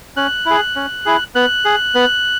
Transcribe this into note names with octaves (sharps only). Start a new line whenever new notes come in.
C#4 F#6
E4 G#4
C#4
E4 G#4
B3 F#6
G#4
B3